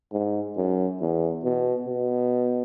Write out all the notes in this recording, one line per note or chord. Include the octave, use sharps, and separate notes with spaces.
G#2
F#2
E2
B2
B2